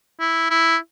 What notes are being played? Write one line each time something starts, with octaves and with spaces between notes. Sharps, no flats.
E4
E4